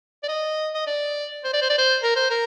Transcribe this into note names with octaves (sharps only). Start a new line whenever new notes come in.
D5
D#5
D#5
D5
C5
D5
C5
D5
C5
A#4
C5
A#4